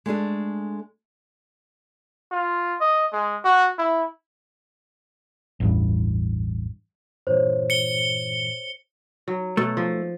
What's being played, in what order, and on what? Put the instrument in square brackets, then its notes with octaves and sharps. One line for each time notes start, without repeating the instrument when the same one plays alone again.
[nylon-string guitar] G#3 A3 D4 G#4
[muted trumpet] F4
D#5
G#3
F#4
E4
[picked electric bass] A1 E2 G2
[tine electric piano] G2 A#2 E3 [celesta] C5 C#5
[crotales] C#7 G7
[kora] F#3
[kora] B2 [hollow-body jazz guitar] A3
[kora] F3